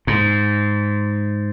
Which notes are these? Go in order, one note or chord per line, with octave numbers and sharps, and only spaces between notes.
G#2